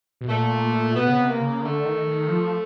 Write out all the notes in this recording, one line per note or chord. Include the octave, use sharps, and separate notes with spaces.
B2
A#2 A3
B2 B3
C#3
C3
A#3
C#3
D3 A3
D#3
D#3
F3